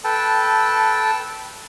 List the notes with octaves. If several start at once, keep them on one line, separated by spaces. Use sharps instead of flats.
A4 B4 G5 A5